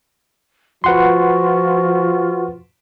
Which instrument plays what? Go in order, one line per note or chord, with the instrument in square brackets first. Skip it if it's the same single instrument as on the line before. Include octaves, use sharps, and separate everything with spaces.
[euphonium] F3 [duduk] F4 [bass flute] F#4 [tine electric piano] B4 F#5 C6